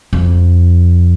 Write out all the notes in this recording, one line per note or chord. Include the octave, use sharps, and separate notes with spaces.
F2